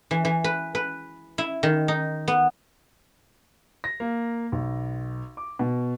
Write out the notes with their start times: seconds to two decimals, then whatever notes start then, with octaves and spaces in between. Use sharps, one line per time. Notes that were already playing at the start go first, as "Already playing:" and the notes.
0.11 E3
0.25 E3
0.44 B4
0.75 B4
1.38 E4
1.63 D#3
1.88 D#4
2.28 B3
3.84 A#6
4.00 A#3
4.52 B1
5.37 D6
5.59 B2